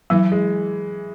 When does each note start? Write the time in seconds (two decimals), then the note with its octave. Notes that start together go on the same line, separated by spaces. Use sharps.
0.10 E3 F#3
0.32 G#3